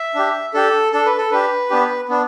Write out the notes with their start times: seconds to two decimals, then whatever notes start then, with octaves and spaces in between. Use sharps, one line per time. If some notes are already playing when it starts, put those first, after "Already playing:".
Already playing: E5
0.15 D4 G4
0.54 D4 G4 A4
0.92 D4 A4
1.06 B4
1.18 A4
1.31 D4 G4 B4
1.70 B3 D4 G4
2.09 B3 D4